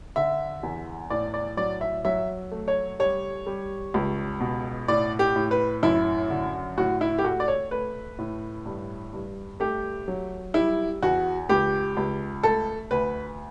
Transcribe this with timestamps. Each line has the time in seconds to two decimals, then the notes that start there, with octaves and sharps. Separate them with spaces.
0.16 D3 E5
0.63 E2
1.10 A2 D5
1.34 D5
1.57 F#3 D5
1.81 E5
2.05 F#3 E5
2.52 A3
2.68 C#5
2.99 G3 C#5
3.47 G3
3.94 C#2
4.40 B2
4.88 A2 D5
5.19 G4
5.36 A2
5.51 B4
5.83 F#2 E4
6.30 D3
6.78 A2 F#4
7.01 E4
7.18 G4
7.24 A3 F#4
7.40 D5
7.48 C#5
7.71 A3 B4
8.19 A2
8.66 G2
9.13 G2
9.60 A3 G4
10.08 F#3
10.54 G3 E4
11.02 E2 F#4
11.49 C#2 G4
11.97 C#2
12.43 A3 A4
12.91 D2 B4